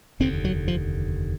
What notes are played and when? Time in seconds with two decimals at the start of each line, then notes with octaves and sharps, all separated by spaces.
0.20 F1 D#2 D3 C4
0.45 F#3
0.68 F3